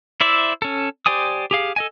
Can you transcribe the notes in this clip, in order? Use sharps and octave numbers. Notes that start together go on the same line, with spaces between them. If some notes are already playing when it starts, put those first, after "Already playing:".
E4 C5 D5 E5
C#4 A4
G4 C5 D5 G#5 D#6
G4 G#4 F5
A4 D#5 G#5